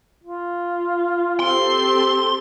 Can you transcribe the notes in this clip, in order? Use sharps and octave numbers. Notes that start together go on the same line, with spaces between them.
F4
C4 G4 A4 C6